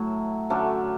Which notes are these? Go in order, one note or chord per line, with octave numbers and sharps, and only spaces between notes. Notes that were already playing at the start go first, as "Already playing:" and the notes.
Already playing: A2 F#3 A3
D3 F#3 A3 C#4 D4